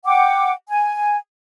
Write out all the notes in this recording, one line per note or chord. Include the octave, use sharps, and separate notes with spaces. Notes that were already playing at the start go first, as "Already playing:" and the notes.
F#5 G5 D6
G#5